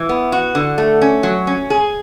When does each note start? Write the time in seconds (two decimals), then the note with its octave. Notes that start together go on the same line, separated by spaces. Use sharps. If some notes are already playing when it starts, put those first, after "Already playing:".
Already playing: E3
0.09 B3
0.32 F#4
0.55 D3
0.78 A3
1.02 C#4
1.23 F#3
1.47 C#4
1.70 G#4